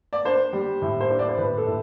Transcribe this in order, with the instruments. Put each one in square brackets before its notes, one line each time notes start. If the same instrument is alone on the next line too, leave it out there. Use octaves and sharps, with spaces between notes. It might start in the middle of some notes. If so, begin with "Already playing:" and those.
[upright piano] D5
D4 C5
G3
A2
C5
D4
D5
C5
A2 B4
A4
A2